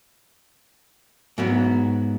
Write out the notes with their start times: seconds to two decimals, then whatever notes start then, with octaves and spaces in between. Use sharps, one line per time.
1.38 G#2 F#3 B3